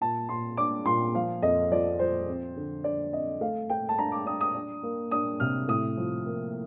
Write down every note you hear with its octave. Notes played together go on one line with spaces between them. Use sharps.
A#2 A5
A#2 C6
D4 D6
A#2 C6
F3 F5
F2 D#5
F3 D5
F3 C5
C4
D3
D3 D5
C4 D#5
A3 F5
A3 G5
A5
D4 A#5
D6
D4 D#6
D#6
D4
A#3
D4 D#6
C3 F6
A2 D#6
F3
A#3